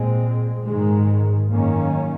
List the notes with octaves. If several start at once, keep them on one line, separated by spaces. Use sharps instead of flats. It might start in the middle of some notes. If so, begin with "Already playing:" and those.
Already playing: A#2 G#3 C4
G#2 D#3 G#3
F#2 D#3 A#3 C#4